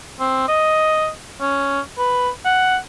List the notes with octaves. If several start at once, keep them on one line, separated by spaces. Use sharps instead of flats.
C4
D#5
C#4
B4
F#5